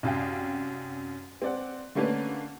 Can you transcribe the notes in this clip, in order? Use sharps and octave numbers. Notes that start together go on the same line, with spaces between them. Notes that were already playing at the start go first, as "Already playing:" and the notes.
C2 F#2 F5 G5
C4 D5 F#5
D3 A3 A#3 C#4 D4 B4